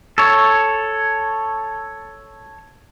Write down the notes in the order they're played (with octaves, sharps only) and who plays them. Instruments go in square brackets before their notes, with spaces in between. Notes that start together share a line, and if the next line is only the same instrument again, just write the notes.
[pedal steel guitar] A4 C#5